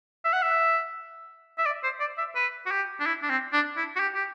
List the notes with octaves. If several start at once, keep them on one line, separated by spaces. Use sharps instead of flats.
E5
F#5
E5
E5
D5
C5
D5
E5
B4
F#4
G4
D4
E4
D4
C4
D4
E4
F#4
G4
G4